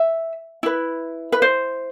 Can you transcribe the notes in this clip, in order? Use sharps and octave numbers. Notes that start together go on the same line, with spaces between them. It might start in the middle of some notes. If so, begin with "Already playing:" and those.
Already playing: E5
E4 B4
B4
C5